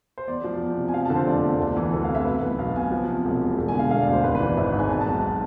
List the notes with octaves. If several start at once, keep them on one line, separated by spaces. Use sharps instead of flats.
C5
E2 D5
F3
E2
C3
G#5
F3 F5
A5
D3
C5
F1 D5
E2
D2
E3
D2 A4
F5
C3
E5
B2 B4
B1 B4
B1 F5
B2 G#5
F3
C3
E1
E2
E1
G#5
D3
F5
E1 F5
D5
D2
C5
G#1 B4
B4
E3
D5
G#1 E5
G#2
G#5
B2 A5
A5
B1
A5